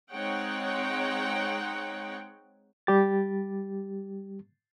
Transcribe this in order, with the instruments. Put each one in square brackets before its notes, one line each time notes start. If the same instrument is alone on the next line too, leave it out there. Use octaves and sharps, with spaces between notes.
[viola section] G#3 C4 D#4 C#5 F#5 G5
[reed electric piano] G3 G4 A6